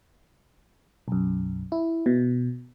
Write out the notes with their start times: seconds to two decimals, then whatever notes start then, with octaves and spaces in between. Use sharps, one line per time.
1.08 B1 F#2
1.72 E4
2.06 B2